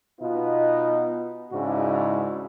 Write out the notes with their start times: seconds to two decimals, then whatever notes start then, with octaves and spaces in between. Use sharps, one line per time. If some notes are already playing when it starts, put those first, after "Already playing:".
0.20 B2 B3 D#4 F4
1.51 G#2 C#3 D4 E4 F#4